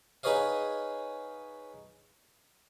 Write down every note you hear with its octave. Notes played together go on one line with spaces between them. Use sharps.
D#4 G#4 B4 C#5 D#5 F5